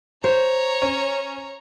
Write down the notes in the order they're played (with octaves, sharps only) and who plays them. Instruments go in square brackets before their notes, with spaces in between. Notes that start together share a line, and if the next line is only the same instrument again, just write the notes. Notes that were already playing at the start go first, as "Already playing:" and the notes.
[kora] C5 [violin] C#5 A#5
[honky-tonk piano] C#4